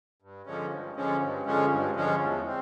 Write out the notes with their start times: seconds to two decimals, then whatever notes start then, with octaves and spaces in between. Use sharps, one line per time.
0.22 G2
0.46 D3 F3 G#3 C#4
0.71 G2
0.96 D3 F3 G#3 C#4
1.22 G2
1.46 D3 F3 G#3 C#4
1.71 G2
1.96 D3 F3 G#3 C#4
2.20 E2
2.47 C4